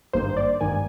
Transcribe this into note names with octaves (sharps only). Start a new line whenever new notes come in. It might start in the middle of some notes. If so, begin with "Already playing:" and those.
G#1 G2 D#3 A#3 C5
D5
G#1 G2 D#3 A#3 G#5